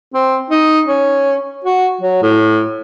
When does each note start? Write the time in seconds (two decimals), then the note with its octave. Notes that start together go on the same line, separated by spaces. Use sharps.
0.14 C4
0.50 D#4
0.87 C#4
1.64 F#4
2.01 F#3
2.22 A2